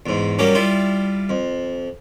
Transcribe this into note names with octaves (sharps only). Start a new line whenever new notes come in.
E2 G#2
F#3 G3 A#3 C#4
G3 E4 F4
F2